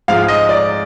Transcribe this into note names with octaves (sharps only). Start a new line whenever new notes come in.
G#2 F3 G#3 F5
D#5
D5